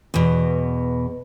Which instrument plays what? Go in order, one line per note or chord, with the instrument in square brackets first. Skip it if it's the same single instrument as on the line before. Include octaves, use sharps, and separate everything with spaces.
[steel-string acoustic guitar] E2 B2